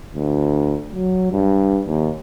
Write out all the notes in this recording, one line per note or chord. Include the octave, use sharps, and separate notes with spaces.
D2
F#3
G2
D#2